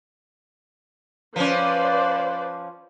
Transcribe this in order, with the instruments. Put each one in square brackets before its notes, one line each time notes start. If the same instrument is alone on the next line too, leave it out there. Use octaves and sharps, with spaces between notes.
[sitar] F3 C#4 [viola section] B4 C5 D5